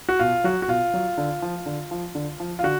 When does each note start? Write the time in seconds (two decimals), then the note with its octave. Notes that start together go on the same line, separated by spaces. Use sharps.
0.09 F#4
0.19 B2 F4
0.44 F#3 F#4
0.62 F#4
0.68 B2 F4
0.94 F#3
1.17 D3
1.42 F3
1.66 D3
1.91 F3
2.15 D3
2.40 F3
2.59 F4
2.63 D3 F#4